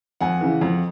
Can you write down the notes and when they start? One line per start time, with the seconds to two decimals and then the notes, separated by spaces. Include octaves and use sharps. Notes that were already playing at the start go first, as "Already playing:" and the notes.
0.21 F2 F#5 G#5
0.41 C#3 E3
0.61 F2